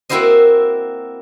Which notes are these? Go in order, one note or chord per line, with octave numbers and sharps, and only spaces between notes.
A#3 C4 E4 F#4 C5 D#5